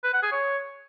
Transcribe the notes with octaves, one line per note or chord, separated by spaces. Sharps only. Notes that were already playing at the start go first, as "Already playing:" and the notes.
B4
F#5
G#4
C#5